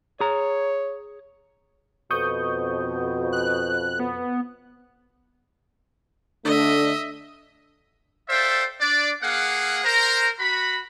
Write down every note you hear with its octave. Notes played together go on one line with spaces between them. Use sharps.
G#4 C#5 A#5
F2 B2 C#6 D#6 G6
F#6
B3
D3 A3 D4 D#5 E5
A4 C5 D5 E5 F5 G5
D4 D5
A#3 G#4 F5 F#5
A#4 C5 A#5
F#4 B5